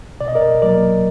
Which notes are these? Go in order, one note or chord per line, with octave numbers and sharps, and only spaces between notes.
B2 D5
D#5
A#4 D5
F#3 A#3 A#4 D5